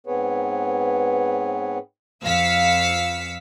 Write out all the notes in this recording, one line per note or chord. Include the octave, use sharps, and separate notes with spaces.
G#2 B3 C4 G#4 B4 C#5
F2 F5 E6 B6 C#7